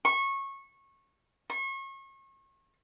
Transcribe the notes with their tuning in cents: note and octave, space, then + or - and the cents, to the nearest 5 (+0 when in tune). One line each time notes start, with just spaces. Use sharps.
C#6 -20
C#6 -35